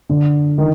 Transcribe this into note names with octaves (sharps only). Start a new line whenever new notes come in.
D3
D#3